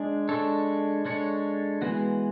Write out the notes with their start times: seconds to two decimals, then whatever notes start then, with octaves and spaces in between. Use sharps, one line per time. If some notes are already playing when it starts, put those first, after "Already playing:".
Already playing: G#3 D4
0.29 G#3 D4 A4 C#5
1.05 G#3 D4 A4 C#5
1.82 E3 G#3 B3 F#4